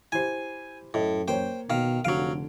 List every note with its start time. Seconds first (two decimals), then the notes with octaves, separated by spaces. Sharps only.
0.12 E4 G4 C5 G#5
0.94 F#2 A2 D#5
1.28 A#3 A#4 C5 C#5 G5
1.70 B2 D#3 F5
2.05 F1 D3 F#3 F5 D7